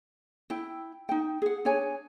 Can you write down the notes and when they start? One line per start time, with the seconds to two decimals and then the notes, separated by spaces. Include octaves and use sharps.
0.50 E4 G5
1.09 D#4 G5
1.42 G#4 F#5
1.65 D4 G#4 C#5 G#5